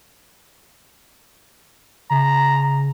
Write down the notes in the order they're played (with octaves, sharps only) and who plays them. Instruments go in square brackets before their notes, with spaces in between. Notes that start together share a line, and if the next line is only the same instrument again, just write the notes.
[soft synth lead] C#3 [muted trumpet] A#5